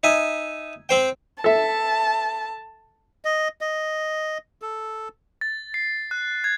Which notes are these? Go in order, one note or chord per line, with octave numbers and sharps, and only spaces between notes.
D#4 E5 G#5
C4 C5 G5
A4 E5 A5
D#5
D#5
A4
A6
C7
F#6
G#6